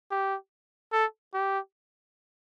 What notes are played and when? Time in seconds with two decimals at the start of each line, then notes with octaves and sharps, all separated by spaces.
0.11 G4
0.92 A4
1.34 G4